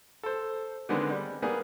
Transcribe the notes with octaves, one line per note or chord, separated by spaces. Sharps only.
A4 C5
D3 D#3 G#3 B3 C4
G3
G3 A#3 B3 G#4